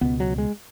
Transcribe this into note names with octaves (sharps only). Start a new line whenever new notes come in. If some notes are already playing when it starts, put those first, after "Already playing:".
C#2 B2 B3
F#3
G#3